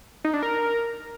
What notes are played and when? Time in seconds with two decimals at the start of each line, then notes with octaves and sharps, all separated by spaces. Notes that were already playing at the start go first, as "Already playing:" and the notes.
0.24 D#4
0.33 D4
0.43 A#4